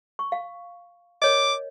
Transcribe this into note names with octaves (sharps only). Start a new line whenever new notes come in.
C#6
F5
A#4 C#5 D#5 D6